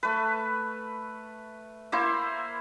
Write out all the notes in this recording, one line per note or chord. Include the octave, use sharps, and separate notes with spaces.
A3 B4
A#3 E4 C5